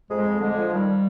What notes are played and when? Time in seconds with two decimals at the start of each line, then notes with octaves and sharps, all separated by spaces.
0.10 F2 G#3
0.25 F2
0.40 D3 G#3
0.56 F3
0.72 D#3 G3